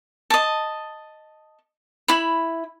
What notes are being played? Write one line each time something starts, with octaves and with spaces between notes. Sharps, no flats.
D#5 A5
E4 B5